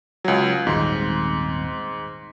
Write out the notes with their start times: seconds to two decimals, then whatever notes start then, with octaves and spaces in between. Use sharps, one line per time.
0.24 C#2 F#3
0.67 D#1 G#1 G#2 C6